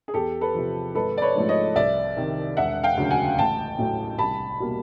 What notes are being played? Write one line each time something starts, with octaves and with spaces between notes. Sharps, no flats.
G#4
E2 G4 A4
A4 B4
C3 F3
G#1 A4 B4
D5
B4 C#5
G#2 F3 A3
C#5 D#5
C2 D5 E5
C3 D#3
E1 E5 F#5
F5 G5
D2 C#3 F#3
F#5 G#5
A1 G5 A5
A2 F#3 A3
C2 A5 B5
B2 G3 A#3